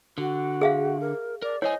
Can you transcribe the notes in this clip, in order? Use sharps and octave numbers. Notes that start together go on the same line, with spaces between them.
D3 F#4
G#4 E5 F5
A#4
A#4 D5
E4 C5 C#5 D#5 G#5